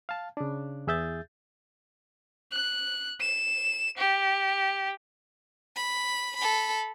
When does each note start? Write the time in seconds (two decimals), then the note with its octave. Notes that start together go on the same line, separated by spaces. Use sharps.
0.09 F5 A5
0.37 C#3 D4
0.87 E2 G#4 E5 G6 A6
2.52 F#6
3.20 E7
3.98 G4
5.76 B5
6.37 A4 B5